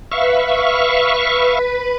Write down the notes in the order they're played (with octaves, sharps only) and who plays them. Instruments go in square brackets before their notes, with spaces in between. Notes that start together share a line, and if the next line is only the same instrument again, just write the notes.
[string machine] B4 B5 [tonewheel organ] E5 F5 C#6